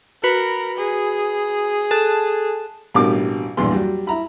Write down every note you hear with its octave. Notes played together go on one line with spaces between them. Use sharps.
F#4 A#4 B4 B5
G#4
A4 A5 F#6
A1 B2 G3 A#3 D4 D6
A#1 E2 G2 B3 C6
F#3 G3
E4 A#5 B5